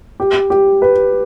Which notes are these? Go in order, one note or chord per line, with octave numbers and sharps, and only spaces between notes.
G4
G4
B4